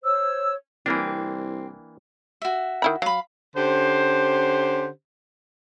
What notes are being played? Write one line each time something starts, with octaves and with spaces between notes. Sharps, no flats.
C5 C#5 E6
C2 E3 A#3 C4 D4
F#4 E5
D#3 E4 B5
F#3 F5 B5
D3 C#4 G4 C5